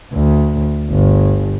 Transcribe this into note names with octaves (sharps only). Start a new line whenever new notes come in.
D2
G1